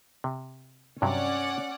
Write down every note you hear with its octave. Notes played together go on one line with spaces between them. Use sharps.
C3
G2 C3 F#3 C#4 D5 F#5